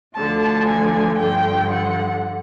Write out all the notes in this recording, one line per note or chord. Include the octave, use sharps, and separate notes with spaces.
D2 D3 F3 A5
G#5
G2 D3 F3 G5
F#5